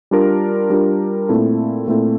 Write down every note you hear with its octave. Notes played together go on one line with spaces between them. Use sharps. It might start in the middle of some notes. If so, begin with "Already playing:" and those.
G3 D4 F4 A#4
G3 D4 F4 A#4
A#2 A3 C4 E4 A4
A#2 A3 C4 E4 A4